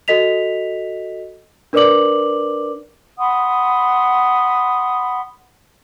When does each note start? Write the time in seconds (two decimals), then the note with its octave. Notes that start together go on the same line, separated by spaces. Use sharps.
0.08 F#4 A4 D#5 B6 F7
1.73 D4 A#4 B4 D5 D6 F#7
3.18 F#5 B5 C6 D#6